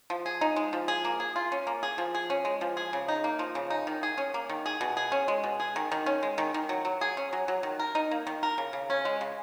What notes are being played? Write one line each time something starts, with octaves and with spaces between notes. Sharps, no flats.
F3
G#4
D#4
G#3
F3
G#4
A#3
G#4
F4
C#4
A#3
G#4
F3
G#4
C#4
G#3
F3
G#4
C#3
D#4
A#3
F3
C#3
D#4
D#3
G#4
C#4
A#3
D#3
G#4
B2
G#4
C#4
G#3
B2
G#4
D#3
D#3
C#4
G#3
D#3
D#3
F#3
F#3
G#4
C#4
F#3
F#3
D#3
A#4
D#4
A#3
D#3
A#4
C#3
C#3
C#4
G#3
C#3